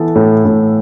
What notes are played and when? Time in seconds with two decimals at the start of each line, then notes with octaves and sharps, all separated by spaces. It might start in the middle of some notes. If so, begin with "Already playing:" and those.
Already playing: E3 B3 A4
0.15 A2
0.45 A2